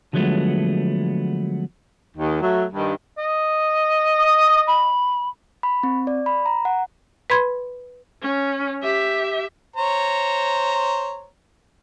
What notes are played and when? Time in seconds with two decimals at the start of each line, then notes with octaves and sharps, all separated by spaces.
0.13 D3 F3 F#3 G#3 A3 B3
2.16 D#2 D#3
2.41 F#3 A3
2.72 G2 D#3
3.18 D#5
4.19 D#6
4.68 B5
5.63 B5
5.83 C4
6.07 D5
6.26 B5
6.46 A#5
6.65 F#5
7.30 B4 B5 C6 G#6
8.22 C#4
8.83 G4 E5
9.76 C5 C#5 A#5